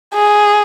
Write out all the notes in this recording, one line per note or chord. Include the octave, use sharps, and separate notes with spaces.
G#4